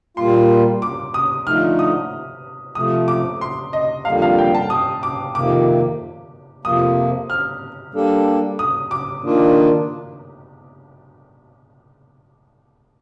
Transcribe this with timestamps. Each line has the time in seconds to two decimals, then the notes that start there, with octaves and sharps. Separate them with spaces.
0.17 A#2 G3 A#3 F4 C6
0.82 D6
1.14 D#6
1.47 D3 F3 A3 D#4 F6
1.79 D#6
2.75 C3 F3 A3 D#6
3.08 D6
3.41 C6
3.73 D#5
4.05 F2 D3 G3 A#3 F5
4.22 F5
4.38 G5
4.55 A5
4.70 D#6
5.03 D6
5.35 F2 C3 D#3 A#3 D6
6.65 F2 C3 F3 A#3 D#6
7.30 F6
7.94 G3 A#3 D4 A4
8.59 D#6
8.91 D6
9.24 D#3 A#3 D4 F4